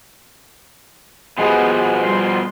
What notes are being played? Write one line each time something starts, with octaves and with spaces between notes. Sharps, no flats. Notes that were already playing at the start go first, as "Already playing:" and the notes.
B2 F3 G#3 B3 G4 G#4
G3 C6